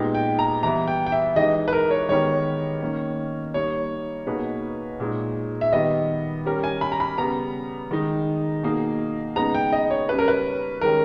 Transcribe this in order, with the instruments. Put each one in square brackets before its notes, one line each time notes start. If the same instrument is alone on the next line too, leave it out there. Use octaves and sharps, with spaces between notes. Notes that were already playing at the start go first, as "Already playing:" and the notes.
Already playing: [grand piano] A#2 G#3 B3 D#4 G4
[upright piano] G5
A#5
[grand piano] E3 G3 B3 E4 [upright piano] A#5
[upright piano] G5
G5
E5
[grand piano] E3 G#3 D#4 G4 [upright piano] D#5
[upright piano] B4
A#4
C#5
[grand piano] D#3 G#3 B3 G4 A#4 [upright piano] C#5
[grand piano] D#3 A#3 C#4
[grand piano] G3 A#3 D#4 [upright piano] C#5
[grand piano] B2 A#3 D#4 G#4 B4
A#2 G#3 D#4
[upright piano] E5
[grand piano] D#3 G3 B3 G4 [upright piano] D#5
[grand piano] G3 C#4 G4 A#4
[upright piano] G#5
B5
A#5
B5
[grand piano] C#3 G3 B3 [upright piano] A#5
[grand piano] D#3 G#3 D#4
B2 A#3 D#4 G#4
[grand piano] C#3 G#3 B3 D#4 [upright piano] A#5
[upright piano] G5
D#5
C#5
[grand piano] C#3 G3 C#4 [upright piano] B4
[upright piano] A#4
B4
[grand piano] D#3 G#3 C#4 G4 [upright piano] A#4